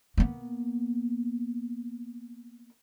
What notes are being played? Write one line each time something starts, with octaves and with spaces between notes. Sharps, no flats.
A#3 B3